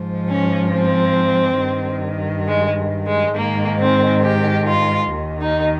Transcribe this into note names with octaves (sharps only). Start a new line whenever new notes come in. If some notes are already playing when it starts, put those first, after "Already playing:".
Already playing: G#2 F3
C#4
C4
G2 D#3
G#3
G#3
G#2 D#3 A#3
C4
G4
F4
D#2 D#3
D#4